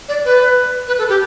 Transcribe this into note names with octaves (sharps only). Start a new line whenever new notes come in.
D5
B4
B4
A4
G4